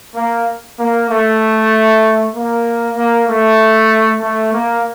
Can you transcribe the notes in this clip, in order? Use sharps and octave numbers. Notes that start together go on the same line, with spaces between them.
A#3
A#3
A3
A#3
A#3
A3
A3
A#3